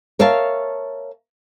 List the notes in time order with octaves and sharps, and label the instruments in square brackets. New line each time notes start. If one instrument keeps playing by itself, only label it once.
[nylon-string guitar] A#4 C#5 E5 F5 A5